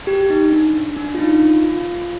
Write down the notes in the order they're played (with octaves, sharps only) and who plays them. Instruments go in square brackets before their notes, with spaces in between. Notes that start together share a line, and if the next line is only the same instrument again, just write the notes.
[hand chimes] G4
D#4
D4
D4
F4
D#4
F4
F4